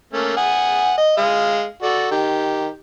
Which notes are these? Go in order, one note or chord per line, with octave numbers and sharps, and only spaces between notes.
A3 A#3 C#4
F#5 G#5 D#6
D#5
G#3 F5 D#6
F#4 A4 D5
D#3 G4